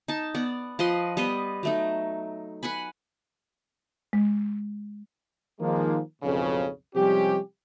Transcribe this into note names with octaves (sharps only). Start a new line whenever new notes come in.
D#4 A5
B3 D5
F3 B4 D#5 C6
G3 B3 B4 D#5
F#3 A3 D#4
B4 F#5 G#5 B5
G#3
D#3 F3 G#3 A#3
B1 F2 G#2 C#3
C3 F3 G3 G#3 C#4 G4